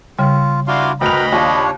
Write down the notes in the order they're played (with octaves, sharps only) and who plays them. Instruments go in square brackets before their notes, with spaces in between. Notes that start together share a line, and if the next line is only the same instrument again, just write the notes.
[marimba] C#3 G3 [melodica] F4
[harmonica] D4 F5 C6 [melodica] E4 F#4 D5
[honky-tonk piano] D2 F7 [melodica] A#4 B4 G5 [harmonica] D#5 B5
[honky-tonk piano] D#2 F4 [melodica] D4 C#5